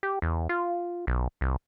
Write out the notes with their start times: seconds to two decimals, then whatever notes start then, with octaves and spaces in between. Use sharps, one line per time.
0.03 G4
0.22 E2
0.49 F4
1.07 B1
1.41 C2